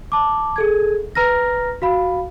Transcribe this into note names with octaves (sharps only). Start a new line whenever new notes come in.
A5 D6
G#4 A4 G#6
B4 A#5 F6 A#6
F#4 F5 B5